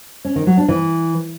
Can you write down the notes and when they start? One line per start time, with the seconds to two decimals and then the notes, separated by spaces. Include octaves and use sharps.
0.25 C#4
0.36 D#3
0.47 F#3
0.57 D4
0.68 E3